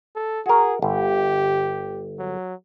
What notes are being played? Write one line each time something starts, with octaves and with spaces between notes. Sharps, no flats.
A4
F#4 G#4 A#4
G1 G4
F#3